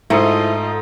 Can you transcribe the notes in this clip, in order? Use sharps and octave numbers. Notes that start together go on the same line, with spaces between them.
G#2 A3 E4 F4 G#4 C5 D#5